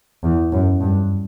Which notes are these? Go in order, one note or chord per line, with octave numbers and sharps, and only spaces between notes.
E2
F#2
G2